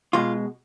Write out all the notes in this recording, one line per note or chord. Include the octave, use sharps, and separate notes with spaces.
B2 G#3 F4